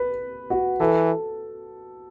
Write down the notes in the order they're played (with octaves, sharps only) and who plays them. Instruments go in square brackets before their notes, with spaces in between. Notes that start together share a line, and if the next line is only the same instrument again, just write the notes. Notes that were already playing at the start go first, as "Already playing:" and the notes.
Already playing: [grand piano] B4
F#4
[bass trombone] E3 [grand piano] A4